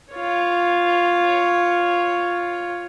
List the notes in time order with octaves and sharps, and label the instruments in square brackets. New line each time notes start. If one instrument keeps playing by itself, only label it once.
[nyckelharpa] F4 C#5